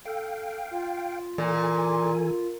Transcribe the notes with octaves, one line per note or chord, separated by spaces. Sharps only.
A4 F5 G5
F4
A#2 E3 A4 G#5